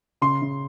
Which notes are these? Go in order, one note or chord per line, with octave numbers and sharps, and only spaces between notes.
C#3 C6
C#3